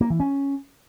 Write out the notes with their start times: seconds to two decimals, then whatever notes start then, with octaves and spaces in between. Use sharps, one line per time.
0.01 A#3
0.10 E3
0.20 C#4